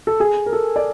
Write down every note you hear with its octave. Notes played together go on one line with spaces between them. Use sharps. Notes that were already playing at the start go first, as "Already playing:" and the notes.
A4
G#4
A#4
A4
D5